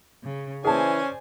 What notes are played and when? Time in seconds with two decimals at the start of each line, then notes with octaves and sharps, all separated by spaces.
0.23 C#3
0.65 E3 C#4 G#4 C5 D5 G#5 A5